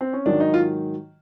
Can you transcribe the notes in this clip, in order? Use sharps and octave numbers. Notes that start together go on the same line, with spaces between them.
C4
C#4
G#2 D#3 F#3 D4
D#4
F4